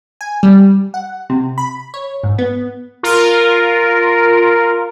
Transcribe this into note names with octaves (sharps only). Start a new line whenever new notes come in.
G#5
G3
F#5
C3
B5
C#5
G#2
B3
F4 A#4